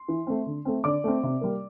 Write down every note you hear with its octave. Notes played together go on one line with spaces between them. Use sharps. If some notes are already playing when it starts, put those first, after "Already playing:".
Already playing: C6
E3
A3 C4
D3
A3 C4
D3 D5 D6
A3 C4
C3
G3 A#3